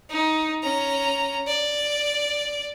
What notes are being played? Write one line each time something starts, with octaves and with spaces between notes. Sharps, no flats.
D#4
C#4 A#5
D5